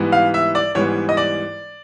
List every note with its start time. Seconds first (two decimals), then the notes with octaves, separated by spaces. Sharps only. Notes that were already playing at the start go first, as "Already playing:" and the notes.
Already playing: G#2 E3 G3 B3
0.12 F5
0.34 E5
0.55 D5
0.75 G#2 E3 G3 B3 C#5
1.09 D#5
1.17 D5